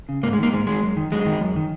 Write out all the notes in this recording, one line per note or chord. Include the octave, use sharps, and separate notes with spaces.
C#3
G#2 A#3
G#3
D#3 A#3
G#2 G#3
D#3 G#3
F#2
D#3
F#2 G#3
D#3
F#2
D#3